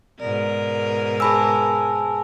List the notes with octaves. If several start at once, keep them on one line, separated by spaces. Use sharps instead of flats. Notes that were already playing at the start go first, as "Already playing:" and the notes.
G#2 B2 A#4 D5
G#4 G#5 A5 B5 E6